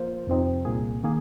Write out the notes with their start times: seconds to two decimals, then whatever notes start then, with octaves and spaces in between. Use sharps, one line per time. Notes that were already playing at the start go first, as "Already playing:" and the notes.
Already playing: F3 A#3 F4 C5
0.27 F2 C3 F3 C4 D#4
0.65 C2 A#2 A#3 G#4
1.03 D#3 A#3 G#4